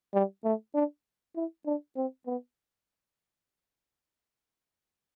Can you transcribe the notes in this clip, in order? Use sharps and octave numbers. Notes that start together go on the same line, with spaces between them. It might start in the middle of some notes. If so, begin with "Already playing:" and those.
G3
A3
D4
E4
D4
C4
B3